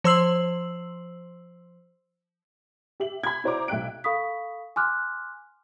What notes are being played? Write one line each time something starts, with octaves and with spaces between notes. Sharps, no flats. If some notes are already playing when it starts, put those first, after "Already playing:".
F3 C5 C6 E6 C7 F#7
G4 E5 F#7
B5 G#6
E4 F#4 C5 D5 A#5 D6
B1 E5 G5 F#6 D7
A4 F5 B5 C#6 D#6 B6
G#5 C6 D6 F6 F#6